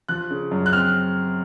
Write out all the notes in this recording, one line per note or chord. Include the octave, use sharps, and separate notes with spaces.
F3 F#6
C#3
F#2
F#6
C4 F6